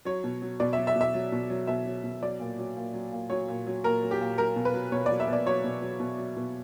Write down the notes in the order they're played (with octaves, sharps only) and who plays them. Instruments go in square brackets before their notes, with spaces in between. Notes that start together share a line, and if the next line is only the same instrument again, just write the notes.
[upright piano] F#3 C#5
B2
F#3
B2 D5
E5
F#3
E5
B2
E5
F#3
B2
F#3
B2 E5
F#3
B2
F#3 D5
A#2
F#3
A#2
F#3
A#2
F#3 C#5
A#2
F#3
A#2 A#4
F#3
G4
A#2
F#3 A#4
B2
B4
F#3
B2 C#5
D5
F#3
E5
B2 D5
F#3 C#5
B2
F#3
B2
F#3
B2